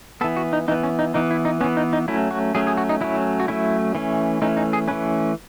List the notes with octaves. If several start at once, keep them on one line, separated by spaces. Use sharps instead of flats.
E3 B3 A4
F#4
D#4
E3 B3 D#4
C#4
D#4
E3 B3 D#4
E4
D#4
E3 B3 C#4
D#4
D#4
F#3 A3 C#4 E4
F#4
F#3 A3 C#4 G#4
G#4
F#4
D#4
F#3 A3 C#4 E4
F#4
F#3 A3 C#4 E4
E3 A3 C#4
E3 A3 C#4 D#4
D#4
G#4
E3 A3 C#4 B4